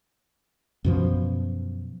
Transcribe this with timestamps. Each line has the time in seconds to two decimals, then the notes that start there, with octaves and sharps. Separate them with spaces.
0.84 F#2 B2 F3